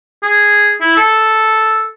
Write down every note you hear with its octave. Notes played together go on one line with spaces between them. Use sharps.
G#4
E4
A4